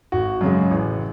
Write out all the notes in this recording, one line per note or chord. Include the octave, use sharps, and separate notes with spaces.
G#1 F#4
F#2 C#3 G#3
A1